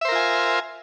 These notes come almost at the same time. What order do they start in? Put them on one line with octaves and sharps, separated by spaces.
E5 C5 A#4 F4 G#5